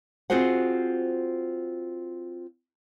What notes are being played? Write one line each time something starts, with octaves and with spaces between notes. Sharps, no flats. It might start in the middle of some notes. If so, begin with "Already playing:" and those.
C4 F4 F#4 G#4 C5 F#5